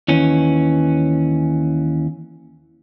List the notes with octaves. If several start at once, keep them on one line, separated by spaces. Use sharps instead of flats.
D#2 E3 C#4